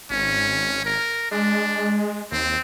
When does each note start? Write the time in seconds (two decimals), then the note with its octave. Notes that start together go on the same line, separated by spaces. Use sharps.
0.10 G#1 C#4
0.85 A#4
1.31 G#3 D4
2.32 D#2 C4